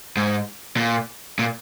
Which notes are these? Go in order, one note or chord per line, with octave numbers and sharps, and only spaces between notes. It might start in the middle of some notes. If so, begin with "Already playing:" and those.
G#2
A#2
A#2